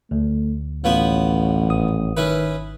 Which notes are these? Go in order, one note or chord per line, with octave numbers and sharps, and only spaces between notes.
D2 A3
A1 F3 B3 C#5
G#1 D#6
D#3 C#4 E4 B4